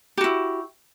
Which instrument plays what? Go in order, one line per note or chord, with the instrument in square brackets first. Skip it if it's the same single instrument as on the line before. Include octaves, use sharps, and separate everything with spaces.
[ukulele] G4
F#4
E4